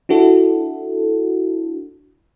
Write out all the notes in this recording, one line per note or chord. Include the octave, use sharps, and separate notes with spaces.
D4 E4 F#4 A4